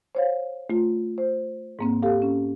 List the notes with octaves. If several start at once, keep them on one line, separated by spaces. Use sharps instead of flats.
C5 C#5 F5
A3 F4
C5
G#2 A#3 C4
G4 A4 F5
C#4